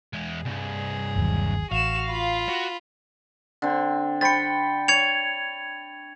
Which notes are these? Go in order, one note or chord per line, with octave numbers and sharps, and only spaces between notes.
E2 G#3
C2 G2 G#4
G1 D#2 F#3
A1 F#4 F5 E7
F4 B5
F#4
D3 C4
C5 G5 B5 A6 C#7
C#5 G#6 C#7 F7